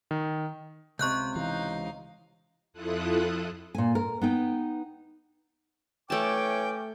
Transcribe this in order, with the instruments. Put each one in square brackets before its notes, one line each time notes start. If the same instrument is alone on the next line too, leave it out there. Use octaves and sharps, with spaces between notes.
[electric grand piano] D#3
[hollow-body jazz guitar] C#2 C3 [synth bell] C#6 F#6 G6
[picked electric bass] E3 [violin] D#4 F5
[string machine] F2 E4 F4 A4 D#6 F#6
[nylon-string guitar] A#2 G#5
A#4
B3 D#4 G5
[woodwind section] E3 C#5 D6 [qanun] A3 A5 [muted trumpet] C#4 [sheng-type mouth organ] G5